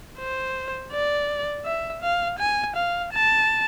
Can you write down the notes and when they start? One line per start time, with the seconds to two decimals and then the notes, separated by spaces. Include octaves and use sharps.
0.19 C5
0.92 D5
1.65 E5
2.02 F5
2.39 G#5
2.76 F5
3.13 A5